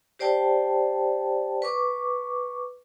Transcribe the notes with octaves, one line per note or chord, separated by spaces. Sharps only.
G4 C5 D5 G5 A5
B4 C#6 D6